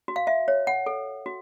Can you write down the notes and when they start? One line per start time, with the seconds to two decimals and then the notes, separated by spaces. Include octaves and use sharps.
0.08 F#4
0.16 F5
0.27 E5
0.48 C#5
0.67 F#5
0.86 A4
1.26 F#4